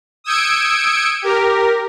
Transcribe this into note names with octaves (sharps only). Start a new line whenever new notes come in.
D#6 E6 G6 G#6 C#7 D7
G4 A#4